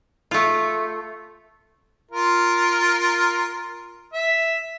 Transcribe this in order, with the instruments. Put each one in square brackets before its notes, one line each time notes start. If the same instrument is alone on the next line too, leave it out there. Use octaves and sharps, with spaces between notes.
[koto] A3 F4
[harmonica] F4 A#4
E5